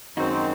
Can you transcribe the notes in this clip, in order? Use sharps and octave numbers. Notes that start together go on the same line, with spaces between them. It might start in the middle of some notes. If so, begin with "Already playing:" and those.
F#2 D#3 G#3 C4 D#4 F#4